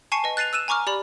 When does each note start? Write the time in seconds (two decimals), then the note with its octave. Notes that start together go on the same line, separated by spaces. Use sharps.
0.12 G#5 A5 C#6 C7 C#7 D#7
0.24 B4 D#5
0.37 F#6 A6 C7 D#7 F7
0.53 E6 F#6 D#7 E7
0.68 G#5 A#5 C#6 D6 F6
0.87 G4 D5 B5